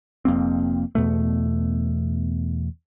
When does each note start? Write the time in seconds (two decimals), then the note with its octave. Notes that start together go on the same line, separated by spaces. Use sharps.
0.25 F1 F2 A#3 C4
0.95 E2 B2 A3